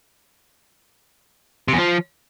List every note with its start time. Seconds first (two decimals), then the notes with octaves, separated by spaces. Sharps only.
1.68 C3
1.73 E2
1.78 F3